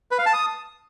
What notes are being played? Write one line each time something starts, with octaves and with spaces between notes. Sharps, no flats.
B4
F5
A5
D#6